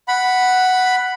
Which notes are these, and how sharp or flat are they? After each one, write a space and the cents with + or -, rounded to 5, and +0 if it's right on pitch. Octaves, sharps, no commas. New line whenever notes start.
F#5 +0 B5 +0